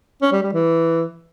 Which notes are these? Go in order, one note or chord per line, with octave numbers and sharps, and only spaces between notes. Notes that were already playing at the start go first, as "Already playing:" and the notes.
C#4
G3
G3
E3